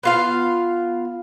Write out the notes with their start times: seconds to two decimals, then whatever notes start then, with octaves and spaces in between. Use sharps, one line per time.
0.03 B3 F4 F5